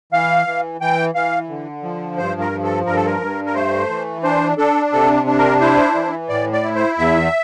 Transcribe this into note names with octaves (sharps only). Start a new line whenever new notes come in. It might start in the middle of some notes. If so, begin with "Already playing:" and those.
E3 F5
E3
E3 G5
E3 F5
D3
F3
G2 C5
A#4
F3
A4
G2 A#4
A4
A#4
G2
A#4
A3 C5
E3
D4 C5
D4 A4
C3 A4
D4
A#4
E4 C5
E3
A2 D5
D5
E4
C5
E2 E5